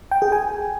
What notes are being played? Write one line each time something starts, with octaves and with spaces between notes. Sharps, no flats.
G5
G#4
G#5